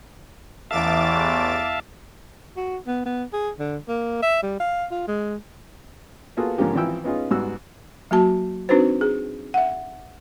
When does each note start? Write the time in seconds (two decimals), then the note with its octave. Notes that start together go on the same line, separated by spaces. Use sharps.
0.71 A1 E2 E5 F5 A5 D6 A6
2.57 F#4
2.87 B3
3.06 B3
3.33 G#4
3.59 D3
3.88 A#3
4.22 E5
4.43 G3
4.60 F5
4.91 F4
5.08 G#3
6.37 A#3 B3 F4 F#4 G#4 A4
6.58 G#2 D3 F3 A#3 C#4 G4
6.75 G#1 E3 F3 E4 G5 E6
7.04 B3 C#4 D#4 F4 G#4
7.31 G#2 G3 B3 F#4 E6
8.11 F#3 A#3 F#4 A5
8.69 C4 D4 D#4 F#4 B4 C5
9.01 G#4
9.54 E5 F#5